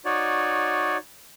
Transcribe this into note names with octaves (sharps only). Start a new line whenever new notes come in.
D#4 F#4 C#5 D5